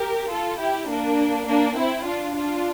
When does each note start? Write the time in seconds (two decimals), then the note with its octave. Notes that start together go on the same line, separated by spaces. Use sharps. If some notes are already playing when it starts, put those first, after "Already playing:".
Already playing: G4 A#4
0.30 F4 A4
0.59 E4 G4
0.89 A#3 D4
1.48 A#3 D4
1.77 C4 E4
2.06 D4 F4
2.35 D4 F4